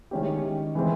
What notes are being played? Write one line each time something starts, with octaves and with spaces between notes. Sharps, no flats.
D#3 G#3 C#4 E4 G4
E3 G#3 C4